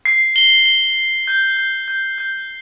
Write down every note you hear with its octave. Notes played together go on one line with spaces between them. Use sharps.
C7
G7
G7
G7
G6
G6
G6
G6